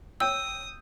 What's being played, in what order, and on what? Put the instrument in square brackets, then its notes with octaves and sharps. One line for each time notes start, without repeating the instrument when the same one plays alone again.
[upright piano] C#5 G5 G6 [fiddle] D#6 [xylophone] E6